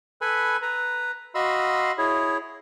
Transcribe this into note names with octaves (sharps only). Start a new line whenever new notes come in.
A4 B4 G#5 B5
B4 A#5
F#4 D#5 F5 B5 C6 E6
E4 G#4 C#5